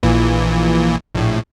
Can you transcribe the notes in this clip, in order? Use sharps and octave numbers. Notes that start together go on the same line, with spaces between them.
A#1 A#2 E3
A#1 A2